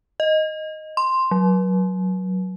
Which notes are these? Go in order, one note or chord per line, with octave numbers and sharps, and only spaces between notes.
D#5
C6
F#3